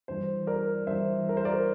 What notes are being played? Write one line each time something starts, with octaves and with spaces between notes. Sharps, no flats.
G2 E3 C5
A#4 D5
G2 E3 C5 E5
A#4
C5
A#4 D5